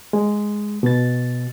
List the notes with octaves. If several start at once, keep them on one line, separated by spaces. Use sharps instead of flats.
G#3
B2 A6